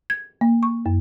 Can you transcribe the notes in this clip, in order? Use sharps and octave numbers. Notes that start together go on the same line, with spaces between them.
G#6
A#3
C#6
F#2